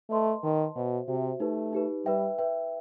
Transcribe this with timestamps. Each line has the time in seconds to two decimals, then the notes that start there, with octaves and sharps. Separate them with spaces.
0.10 A3 B4 D#5 A5 C6
0.43 D#3 B4 D#5 A5 C6
0.76 B2 F#4 C5 E5
1.08 C3 F#4 C5 E5
1.40 A3 D#4 G4 B4
1.73 D#4 G4 B4
2.05 G3 B4 E5 G5
2.39 B4 E5 G5